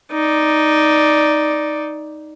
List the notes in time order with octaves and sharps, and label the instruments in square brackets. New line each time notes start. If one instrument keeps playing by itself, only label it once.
[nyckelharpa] D#4 D5